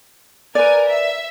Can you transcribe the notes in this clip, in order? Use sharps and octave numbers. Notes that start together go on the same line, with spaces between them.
A#4 B4 D5 G#5
E5